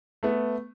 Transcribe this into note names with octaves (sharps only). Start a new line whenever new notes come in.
A3 B3